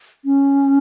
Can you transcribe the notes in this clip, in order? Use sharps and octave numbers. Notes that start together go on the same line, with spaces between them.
C#4